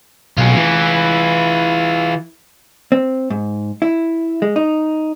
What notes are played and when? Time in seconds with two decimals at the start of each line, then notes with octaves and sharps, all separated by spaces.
0.38 B1 F4 G#4
0.56 E3
2.92 C4
3.30 G#2
3.82 E4
4.42 G#3
4.56 D#4